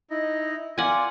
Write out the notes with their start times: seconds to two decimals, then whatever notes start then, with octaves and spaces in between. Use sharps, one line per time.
0.10 D#4 E4 D#5
0.78 F4 D5 F#5 G#5